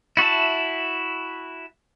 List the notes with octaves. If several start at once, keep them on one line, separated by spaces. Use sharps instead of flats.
E4 F#4 E5 A5